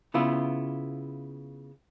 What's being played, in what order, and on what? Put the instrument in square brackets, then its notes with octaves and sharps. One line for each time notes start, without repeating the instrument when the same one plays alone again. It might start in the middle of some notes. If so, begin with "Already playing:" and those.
[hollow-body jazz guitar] C#3 B3 E4 F4